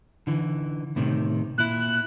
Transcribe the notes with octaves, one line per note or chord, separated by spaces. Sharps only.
D3 E3
A2 C3 D#3
A#2 E4 F#6